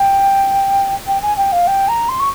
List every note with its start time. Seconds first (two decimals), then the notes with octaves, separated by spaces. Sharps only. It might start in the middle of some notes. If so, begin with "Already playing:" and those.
Already playing: G5
1.07 G5
1.22 G#5
1.37 G5
1.52 F5
1.67 G5
1.88 A#5
2.08 C6
2.19 C#6